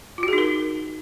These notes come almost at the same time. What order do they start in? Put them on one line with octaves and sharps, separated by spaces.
F4 F#4 G#4 D#4 A#4